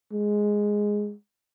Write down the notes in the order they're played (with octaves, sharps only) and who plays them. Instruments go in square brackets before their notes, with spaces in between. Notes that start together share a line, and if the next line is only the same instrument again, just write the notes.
[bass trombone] G#3